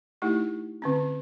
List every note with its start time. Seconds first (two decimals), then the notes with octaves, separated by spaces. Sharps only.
0.22 A3 D#4 E4 G4
0.82 D3 C4 C#4